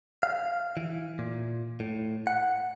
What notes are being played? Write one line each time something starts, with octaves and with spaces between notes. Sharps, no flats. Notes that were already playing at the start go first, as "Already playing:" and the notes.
F5
E3
A#2
A2
F#5